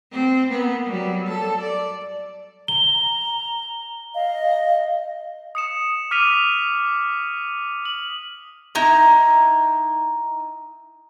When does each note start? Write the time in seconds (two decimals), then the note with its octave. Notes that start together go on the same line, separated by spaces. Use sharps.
0.12 C4
0.49 A#3 B3
0.85 F#3 G3
1.27 A4
1.60 D5
2.68 A#5 G7
4.15 D#5 F5
5.55 D#6 C#7 E7
6.11 D6 F6 B6 D#7 F7
7.85 F#7
8.75 D#4 E4 A#5